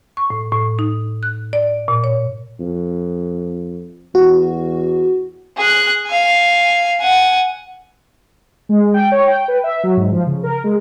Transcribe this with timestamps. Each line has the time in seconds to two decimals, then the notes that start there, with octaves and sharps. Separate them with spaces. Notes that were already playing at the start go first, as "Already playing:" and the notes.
0.17 C#6
0.30 A2
0.52 A2
0.79 D#4
1.23 F#6
1.53 D5
1.88 A#2
2.04 C#5
2.60 F2
4.15 E2 F#4
5.57 G#4 F#6
6.07 F5 G#5
7.01 F#5 G#5
8.69 G#3
8.94 G5
9.12 C#5
9.27 G5
9.48 B4
9.64 E5
9.83 F#3
9.97 G#2
10.13 F3
10.27 C#3
10.43 A#4
10.64 G#3